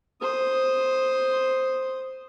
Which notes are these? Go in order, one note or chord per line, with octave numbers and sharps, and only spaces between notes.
C5 D#6